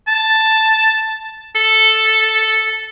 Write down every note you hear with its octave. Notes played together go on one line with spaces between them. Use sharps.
A5
A4